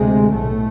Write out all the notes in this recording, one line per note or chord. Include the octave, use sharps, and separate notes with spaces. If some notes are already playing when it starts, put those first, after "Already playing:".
Already playing: D2 C3 G#3
B1 A2 A3